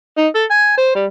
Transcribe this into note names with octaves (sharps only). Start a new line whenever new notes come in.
D#4
A4
G#5
C5
G3